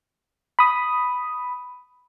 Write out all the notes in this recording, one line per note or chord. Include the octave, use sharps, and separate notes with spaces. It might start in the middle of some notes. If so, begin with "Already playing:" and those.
B5 D#6